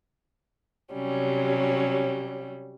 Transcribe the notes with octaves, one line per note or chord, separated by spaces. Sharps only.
C3 F#3 G3 C#4